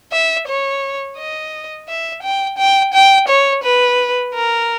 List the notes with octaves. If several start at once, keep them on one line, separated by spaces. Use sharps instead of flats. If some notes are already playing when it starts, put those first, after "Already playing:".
E5
C#5
D#5
E5
G5
G5
G5
C#5
B4
A#4